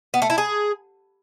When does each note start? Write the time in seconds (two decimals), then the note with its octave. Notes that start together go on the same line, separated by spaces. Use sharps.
0.14 B3
0.22 A3
0.30 E4
0.38 G#4